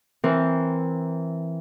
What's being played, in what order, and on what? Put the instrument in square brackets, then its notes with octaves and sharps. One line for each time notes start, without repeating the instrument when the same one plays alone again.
[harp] E3 C4 A#4